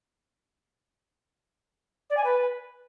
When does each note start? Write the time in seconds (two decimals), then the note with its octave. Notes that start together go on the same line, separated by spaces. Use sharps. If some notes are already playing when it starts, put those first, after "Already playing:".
2.10 D5
2.17 G#5
2.24 B4